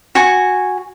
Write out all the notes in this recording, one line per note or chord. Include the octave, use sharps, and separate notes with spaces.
F#4 G#5 C#6